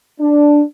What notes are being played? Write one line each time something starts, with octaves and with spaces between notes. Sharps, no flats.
D4